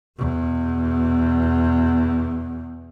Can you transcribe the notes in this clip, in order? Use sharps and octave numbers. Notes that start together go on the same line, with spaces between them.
E2 B2